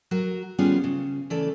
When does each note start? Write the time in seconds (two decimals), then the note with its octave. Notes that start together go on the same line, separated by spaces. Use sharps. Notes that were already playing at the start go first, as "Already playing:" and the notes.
0.11 F#3 F#4 A#4
0.58 D#3 G3 B3 C#4 F4 G#4
0.84 C#3
1.30 C#3 E3 A3 A4 D5